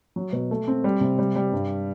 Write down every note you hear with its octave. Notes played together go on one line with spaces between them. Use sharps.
F#3
B2
A3
C4
G3
C3
G3
G3
G2